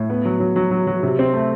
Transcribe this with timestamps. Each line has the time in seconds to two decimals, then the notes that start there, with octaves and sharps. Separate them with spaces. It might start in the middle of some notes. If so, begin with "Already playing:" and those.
Already playing: A2
0.10 B3
0.25 F#3
0.40 F#3
0.56 F#3
0.71 F#3
0.87 F#3
1.03 C3
1.19 C4
1.34 A3